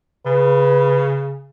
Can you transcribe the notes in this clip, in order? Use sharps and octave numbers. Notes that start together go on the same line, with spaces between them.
C#3 B4